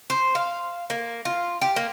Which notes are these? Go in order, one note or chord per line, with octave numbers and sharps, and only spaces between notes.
C5
F5
A#3
F4
G4
A#3